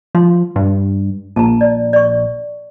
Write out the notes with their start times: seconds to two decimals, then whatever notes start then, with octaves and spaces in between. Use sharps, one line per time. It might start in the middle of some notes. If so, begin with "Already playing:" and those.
0.15 F3 C6
0.56 G2
1.36 A#1 A5 A#5
1.61 D5
1.93 D5 C#6